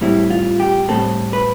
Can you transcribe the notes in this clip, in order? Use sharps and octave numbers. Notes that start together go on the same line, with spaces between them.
A2 G3 C4 E4
F4
G4
A2 G3 C4 A4
B4